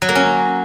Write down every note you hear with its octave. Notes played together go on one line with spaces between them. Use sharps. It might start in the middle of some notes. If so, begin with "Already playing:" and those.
F#3
A#3
C#4